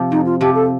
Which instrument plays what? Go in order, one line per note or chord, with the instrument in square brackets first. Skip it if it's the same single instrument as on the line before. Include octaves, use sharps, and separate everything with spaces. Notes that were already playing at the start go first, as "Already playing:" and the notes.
Already playing: [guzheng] C3 F3
[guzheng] F2 [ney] D#4
[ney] F4
[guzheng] C3 F3 [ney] G4
[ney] A4